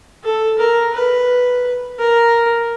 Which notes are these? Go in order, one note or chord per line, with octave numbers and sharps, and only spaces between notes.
A4
A#4
B4
A#4